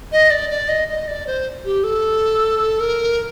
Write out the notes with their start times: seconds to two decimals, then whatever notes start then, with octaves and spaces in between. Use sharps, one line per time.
0.12 D#5
0.31 D5
0.50 D5
0.69 D#5
0.88 D#5
1.08 D5
1.27 C5
1.65 G4
1.84 A4
2.80 A#4